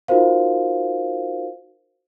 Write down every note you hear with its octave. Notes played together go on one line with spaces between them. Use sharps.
D#4 F4 F#4 A#4 C5 F5